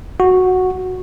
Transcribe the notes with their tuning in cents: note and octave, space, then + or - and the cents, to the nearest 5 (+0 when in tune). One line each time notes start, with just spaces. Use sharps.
F#4 -5